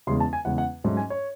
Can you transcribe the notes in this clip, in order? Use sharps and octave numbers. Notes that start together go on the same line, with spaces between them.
E2 C#3 G#3 C6
A5
G#5
E2 C#3 G#3 F#5
F#5
G#2 F#3 A3 C#4
G#5
C#5